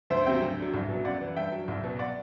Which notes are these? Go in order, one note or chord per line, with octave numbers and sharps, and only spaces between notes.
D2 C5 E5
C3 F#3 E5 G5
D2
D3 F#3
C2
B2 F#3
F#2 D5 F#5
E3
G2 E5 G5
F#3
C2
B2 F#3
D5 F#5